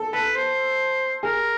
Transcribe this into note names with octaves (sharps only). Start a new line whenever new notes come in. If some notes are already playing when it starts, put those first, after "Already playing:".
Already playing: A4
A4 B4
C5
G#4 A#4